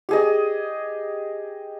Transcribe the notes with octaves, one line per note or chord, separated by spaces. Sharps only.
G4 G#4 D#5